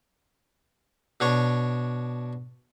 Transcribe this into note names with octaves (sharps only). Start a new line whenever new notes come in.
B2 D4 C#5